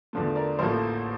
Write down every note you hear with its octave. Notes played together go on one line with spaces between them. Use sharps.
E2 D3 F3 A3
A#4 D5
A1 A2 F3 A#3 A4 C5